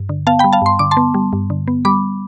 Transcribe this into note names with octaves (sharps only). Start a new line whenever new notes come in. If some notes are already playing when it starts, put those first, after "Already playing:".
Already playing: G2
D3
B3 F5 A5
G5 B5
G3
F5 A5
G2 C6
D3 D6
A5 C6
B3
G3
G2
D3
B3
G3 B5 D6